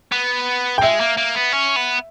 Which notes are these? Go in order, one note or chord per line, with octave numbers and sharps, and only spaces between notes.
B3
G5
G#3 E5
A#3
A#3
B3
C#4
B3